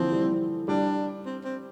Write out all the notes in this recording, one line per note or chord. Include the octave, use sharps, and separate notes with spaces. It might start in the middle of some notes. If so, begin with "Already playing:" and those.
Already playing: D3 E3 F3 C4
G3
G3 D4
C4
C4